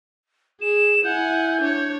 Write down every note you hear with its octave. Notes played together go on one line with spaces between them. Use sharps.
G#4 E7
E4 F#5 G#5 G6
D4 C#5